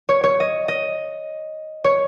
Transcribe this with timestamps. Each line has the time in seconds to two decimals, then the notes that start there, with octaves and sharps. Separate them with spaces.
0.09 C#5
0.24 C#5
0.40 D#5
0.68 D#5
1.84 C#5